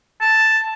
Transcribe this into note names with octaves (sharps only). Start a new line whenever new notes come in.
A5